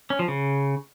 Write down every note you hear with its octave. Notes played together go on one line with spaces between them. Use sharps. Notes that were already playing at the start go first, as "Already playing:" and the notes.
C#4
F3
C#3